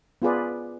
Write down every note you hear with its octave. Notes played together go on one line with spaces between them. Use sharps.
B3 F4 G#4 B4 D5